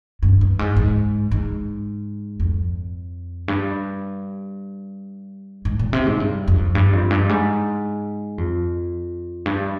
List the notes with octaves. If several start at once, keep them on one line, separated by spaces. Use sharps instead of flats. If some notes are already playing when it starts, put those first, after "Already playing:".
G2
G2
G#2
G#2
G#2
F2
G2
G#2
A#2
C3
G#2
G2
F2
G2
F2
G2
G#2
F2
G2